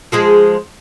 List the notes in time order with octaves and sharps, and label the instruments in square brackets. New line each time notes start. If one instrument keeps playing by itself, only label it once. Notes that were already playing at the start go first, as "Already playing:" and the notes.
[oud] F3 G#3 G#4